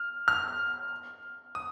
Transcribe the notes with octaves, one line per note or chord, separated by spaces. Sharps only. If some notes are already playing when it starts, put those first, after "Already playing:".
Already playing: F6
F6
D#6